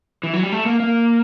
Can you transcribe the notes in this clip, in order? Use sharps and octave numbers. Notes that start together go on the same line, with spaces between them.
E3
F#3
G3
A3
A#3
A#3